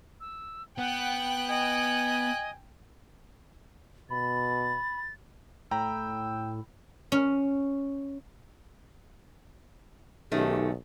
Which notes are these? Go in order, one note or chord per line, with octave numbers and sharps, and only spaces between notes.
E6
B3 F#5 G5 F#6
D#5 G#5
B2 B5 A6
A2 G5 A#5 B5 E6
C#4
B1 D#3 A3 C#4 G4